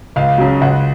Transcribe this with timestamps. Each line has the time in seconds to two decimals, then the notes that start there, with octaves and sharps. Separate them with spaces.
0.16 C#2 F5
0.38 C#3 F#3
0.62 C#2 F#5